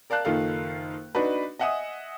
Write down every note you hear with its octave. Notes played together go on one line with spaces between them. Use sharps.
A#4 D5 F5 A5 F#6
F#1 D#3 F4 A4 F5
D4 D#4 F#4 B4
D#5 E5 F#5 G#5 D#6